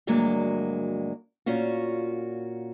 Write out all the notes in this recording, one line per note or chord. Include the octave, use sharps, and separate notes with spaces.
D2 G2 F#3 G#3 A#3
A#2 C#4 F4 F#4